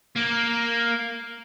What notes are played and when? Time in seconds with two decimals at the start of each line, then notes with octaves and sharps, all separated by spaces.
0.16 A#3